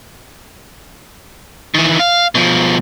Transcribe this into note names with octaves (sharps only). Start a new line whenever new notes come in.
D#3 E3
F5
B2 F3